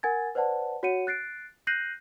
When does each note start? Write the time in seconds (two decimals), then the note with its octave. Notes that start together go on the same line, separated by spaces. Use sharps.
0.03 A#4 F#5 G#5 G#6 A6
0.35 B4 C5 D5 F#5 A5
0.83 F#4 C#5 F#5 C#7 D#7
1.07 F#6 A6 C7 D7
1.67 F#6 G6 A#6 C7 D#7 F#7